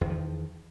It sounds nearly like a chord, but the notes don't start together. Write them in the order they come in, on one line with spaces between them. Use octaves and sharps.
E2 D#3 F3